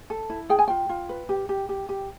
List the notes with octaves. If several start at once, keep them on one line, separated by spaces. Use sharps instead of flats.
A4
E4
G#4 G5
G#5
F4 G5
F4
B4
G4
G4
G4
G4